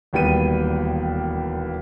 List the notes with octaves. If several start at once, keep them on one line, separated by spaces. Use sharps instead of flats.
E1 D#2 G3 B3 G5 D#7